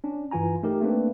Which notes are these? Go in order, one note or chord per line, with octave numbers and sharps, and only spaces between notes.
C#4 D4
G2 E3 F4 G#5 A#5
A3 D#4 G4 A#4
A3 A#3 C4 D4 B4